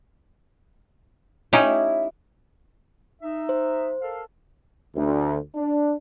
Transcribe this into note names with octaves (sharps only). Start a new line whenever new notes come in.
C#4 D#4 E4 G4
D#4 E5
C5
A4 A#4 F5
D2
D4